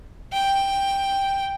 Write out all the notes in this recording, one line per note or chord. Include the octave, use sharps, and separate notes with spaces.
G5